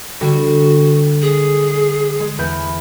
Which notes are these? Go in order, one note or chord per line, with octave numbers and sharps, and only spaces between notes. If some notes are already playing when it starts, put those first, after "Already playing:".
D3 G3 F#4
G#4
G#3
E2 B4 G6